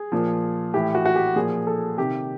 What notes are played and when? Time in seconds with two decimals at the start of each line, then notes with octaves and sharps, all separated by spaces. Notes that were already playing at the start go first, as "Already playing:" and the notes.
Already playing: G#4
0.12 A#2 F3
0.74 A2 E3 G4
0.95 F#4
1.06 F#4
1.16 G4
1.36 A#2 F3 G#4
1.67 A4
1.98 C3 D#3 G4